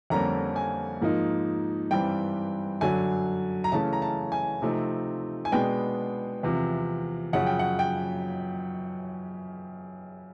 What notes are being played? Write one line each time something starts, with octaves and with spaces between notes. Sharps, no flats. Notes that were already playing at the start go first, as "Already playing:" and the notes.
F2 D3 G3 A#3 C#4 A#5
G#5
G#2 F3 A#3 D#4
G2 E3 G3 C4 G5
F#2 D3 F#3 G#5
A#5
C#3 E3 A3 C#4 A5
A#5
A5
G#5
C3 F3 A3 C4 D#4
G#5
B2 G#3 B3 D4 G5
E2 C3 F3
F#2 C#3 F3 F#5
G5
F#5
G5